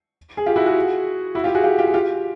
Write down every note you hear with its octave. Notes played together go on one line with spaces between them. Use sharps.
G#4
F4 G4
E4 F#4
F#4 G#4
E4 F#4
F4 G4
F#4 G#4
F4 G4
F4 G4
G#4
F4 G4